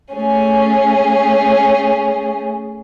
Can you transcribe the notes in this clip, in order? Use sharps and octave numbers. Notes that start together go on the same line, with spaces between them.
A3 C#4 G#4